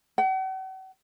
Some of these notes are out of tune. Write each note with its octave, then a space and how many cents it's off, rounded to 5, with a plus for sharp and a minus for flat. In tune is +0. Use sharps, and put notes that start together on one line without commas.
F#5 +45